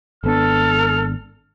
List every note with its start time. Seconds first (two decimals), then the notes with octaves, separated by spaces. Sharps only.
0.24 G#1 B3 D4 A4 F6